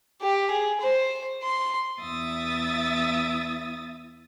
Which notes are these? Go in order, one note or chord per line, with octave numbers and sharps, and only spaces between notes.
G4
G#4
C5
C6
E2 E4 E5 D#6 A6